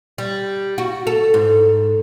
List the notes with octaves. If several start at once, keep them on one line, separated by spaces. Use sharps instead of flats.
G3
F#4
A4
G#2